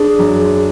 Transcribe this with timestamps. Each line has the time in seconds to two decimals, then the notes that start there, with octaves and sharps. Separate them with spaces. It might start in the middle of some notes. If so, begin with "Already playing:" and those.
Already playing: D4 G#4
0.19 F#2